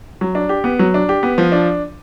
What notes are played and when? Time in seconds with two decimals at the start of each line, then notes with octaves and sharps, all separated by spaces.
0.21 F#3
0.35 D4
0.49 G4
0.64 B3
0.79 F#3
0.94 D4
1.09 G4
1.23 B3
1.38 F3
1.52 D4